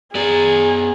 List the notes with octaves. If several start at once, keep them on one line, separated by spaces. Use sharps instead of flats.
B3 G#4 D5